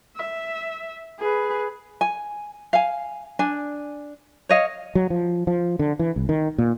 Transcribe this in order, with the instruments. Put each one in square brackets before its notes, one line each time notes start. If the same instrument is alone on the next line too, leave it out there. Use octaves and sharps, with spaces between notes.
[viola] E5
G#4 B4
[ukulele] G#5
F5 G#5
D4 G#5
C#5 D#5 F5
[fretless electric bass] F#3
F3
F3
D3
E3
C2
D#3
A#2